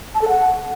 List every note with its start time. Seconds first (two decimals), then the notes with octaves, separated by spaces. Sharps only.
0.15 A5
0.22 A4
0.28 F#5